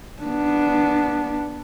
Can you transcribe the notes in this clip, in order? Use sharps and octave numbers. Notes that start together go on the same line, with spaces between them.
B3 D4